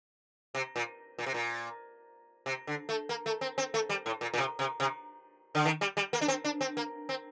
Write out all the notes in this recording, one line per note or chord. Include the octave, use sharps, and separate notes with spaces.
C3
A#2
A#2
C3
A#2
C3
D3
A3
A#3
A3
C4
C4
A3
G3
A2
A#2
A#2
C3
C3
C3
D3
D#3
G3
G3
A#3
D4
C4
D4
C4
A#3
C4